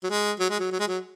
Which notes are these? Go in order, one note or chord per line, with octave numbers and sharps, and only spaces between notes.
F#3
G#3
F#3
G#3
F#3
F#3
G#3
F#3